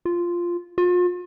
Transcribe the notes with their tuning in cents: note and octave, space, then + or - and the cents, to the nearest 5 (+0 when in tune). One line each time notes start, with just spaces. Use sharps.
F4 -5
F4 +40